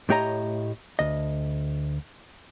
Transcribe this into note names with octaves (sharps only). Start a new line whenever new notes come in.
A2 A3 G4 C#5 D#5 A#5
D2 D#5